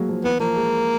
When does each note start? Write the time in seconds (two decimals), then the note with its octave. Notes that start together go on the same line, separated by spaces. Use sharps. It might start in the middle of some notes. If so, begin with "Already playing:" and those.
Already playing: F#3 G#3 A#3
0.09 F3
0.24 E3 B3
0.40 F3 A#3
0.56 G#3